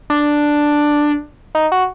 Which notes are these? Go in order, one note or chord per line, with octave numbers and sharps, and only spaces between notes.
D4
D#4
F#4